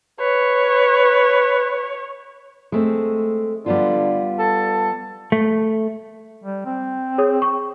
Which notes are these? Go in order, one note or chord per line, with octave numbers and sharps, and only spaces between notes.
B4 C#5
G#3 A3 C4
D3 G3 B3 F4
A4
A3
G3
C4
G#4 C#5 D#6
C#6